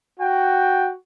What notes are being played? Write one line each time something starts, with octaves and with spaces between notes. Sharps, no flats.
F#4 G5